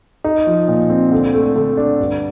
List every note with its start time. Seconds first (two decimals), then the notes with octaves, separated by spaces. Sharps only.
0.24 D#4
0.47 F3
0.68 A#2
0.90 C4
1.12 D3
1.34 A3
1.56 D3
1.77 D4
1.99 G2